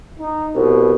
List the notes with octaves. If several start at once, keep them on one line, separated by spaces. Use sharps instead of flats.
D#4
C2 B2